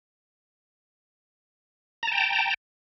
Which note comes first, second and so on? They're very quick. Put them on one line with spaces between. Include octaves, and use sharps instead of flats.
A#5 A5 G5